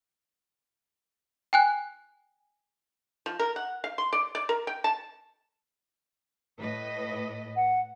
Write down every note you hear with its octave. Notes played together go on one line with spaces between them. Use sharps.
G5 G#5 F#6
F3
A#4
F#5
F5
C6
D5
D5
A#4
G5
A5
A2 B4 D#5
F#5